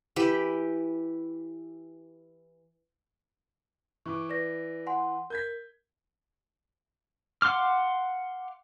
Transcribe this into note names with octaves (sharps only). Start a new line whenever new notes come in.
E3 G4 B5
E3 C#6 D6
B4 D5 A#6
F#5 G#5 C6
A#4 G6 G#6 B6
F5 F#5 C6 D6 F6